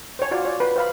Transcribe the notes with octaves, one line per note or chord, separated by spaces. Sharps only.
C5 C#5
F4 F#4 D5
C#5 D5
B4
C5 F5 B5